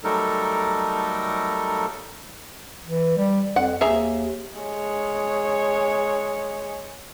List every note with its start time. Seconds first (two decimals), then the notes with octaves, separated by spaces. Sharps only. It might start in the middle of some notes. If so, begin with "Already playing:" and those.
0.04 F#3 G3 A3 D#4 A4 A#4
2.85 E3
3.17 G3
3.56 F2 F#5
3.81 D#2 G#4 E5 A#5
4.59 G#3 C#5